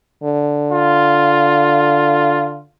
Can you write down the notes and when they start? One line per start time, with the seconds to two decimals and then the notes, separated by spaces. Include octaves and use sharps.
0.24 D3
0.72 F4